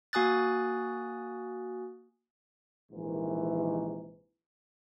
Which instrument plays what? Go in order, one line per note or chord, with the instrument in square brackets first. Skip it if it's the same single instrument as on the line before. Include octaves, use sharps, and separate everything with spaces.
[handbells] A#3 F#4 G#5 D#6 F#6 A6
[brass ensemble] A#1 G#2 C3 D#3 E3